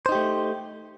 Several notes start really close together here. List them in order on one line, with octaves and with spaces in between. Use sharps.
C5 D#4 G4 A3